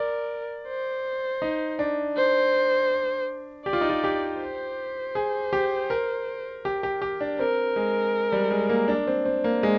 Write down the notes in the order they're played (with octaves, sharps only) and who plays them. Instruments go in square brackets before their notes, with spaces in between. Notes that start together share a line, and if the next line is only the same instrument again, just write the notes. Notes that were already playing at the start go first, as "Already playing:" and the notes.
Already playing: [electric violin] A#4 [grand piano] D5
[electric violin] C5
[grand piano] D#4
D4
[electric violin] C5
[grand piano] G4 [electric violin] D5
[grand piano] F4
D#4
F4
G4
[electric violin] C5
[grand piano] G#4
G4
A#4
G4
G4
G4
D4
[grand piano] C4 [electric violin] A#4
[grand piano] G#3
G3
G#3
A#3
D4
C4
C4
A#3
G#3